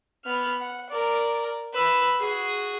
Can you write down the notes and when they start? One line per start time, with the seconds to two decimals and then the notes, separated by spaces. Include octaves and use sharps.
0.25 B3 F6
0.60 F#5
0.89 A#4 D5
1.73 B4 E6
2.20 F#4 G#4